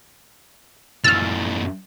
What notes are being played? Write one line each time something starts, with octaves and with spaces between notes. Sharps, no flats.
F#2 E3 E6 F6 A6